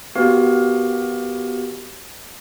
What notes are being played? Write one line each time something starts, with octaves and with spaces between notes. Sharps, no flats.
B3 F#4 G4 A#4 F5